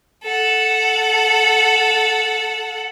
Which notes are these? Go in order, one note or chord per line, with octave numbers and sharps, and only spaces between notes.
A4 F#5